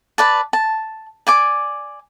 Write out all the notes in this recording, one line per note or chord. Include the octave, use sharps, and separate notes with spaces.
B4 D5 A5
A5
D5 G#5 D6